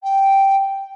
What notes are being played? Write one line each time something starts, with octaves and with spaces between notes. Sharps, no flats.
G5